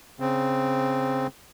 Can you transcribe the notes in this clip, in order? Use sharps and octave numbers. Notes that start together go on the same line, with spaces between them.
C#3 C4